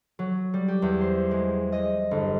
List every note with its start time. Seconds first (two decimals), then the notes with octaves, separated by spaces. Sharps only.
0.19 F#3
0.54 G3
0.68 G4
0.82 E2
1.01 C5
1.31 G#3
1.72 D#5
2.11 G1